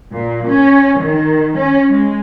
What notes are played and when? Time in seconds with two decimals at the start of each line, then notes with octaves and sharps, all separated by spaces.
0.12 A#2
0.47 C#4
1.01 D#3
1.57 C#4
1.89 G#3